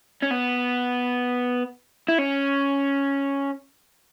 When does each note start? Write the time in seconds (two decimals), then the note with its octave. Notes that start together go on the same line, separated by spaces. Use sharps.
0.23 C#4
0.31 B3
2.08 E4
2.18 C#4